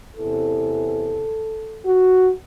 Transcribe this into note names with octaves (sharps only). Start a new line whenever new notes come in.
E2 C3 E3 A4
F#4